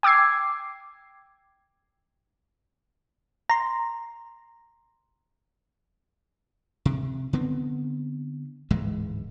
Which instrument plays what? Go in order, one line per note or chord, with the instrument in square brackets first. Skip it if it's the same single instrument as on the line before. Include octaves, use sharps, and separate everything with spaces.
[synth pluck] G5 D6 E6 G#6 C7
A#5 C6
[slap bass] C3
D3 B3 C4
D1 G#2 E3 G#3